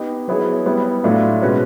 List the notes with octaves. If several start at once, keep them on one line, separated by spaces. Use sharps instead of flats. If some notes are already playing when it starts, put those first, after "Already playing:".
Already playing: B3 D#4 G4
F#3 B3 E4 G#4 C#5
G3 B3 E4
A2 F#3 A3 D4 F4
B2 G#3 C#4 F#4 B4